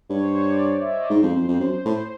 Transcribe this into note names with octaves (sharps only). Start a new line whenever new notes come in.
G2 C#5
C5
C#5
D5
E5
D#5
D5
C#5
G#2 C5
F2
F2 C5
F2
F#2 C5
A2 C5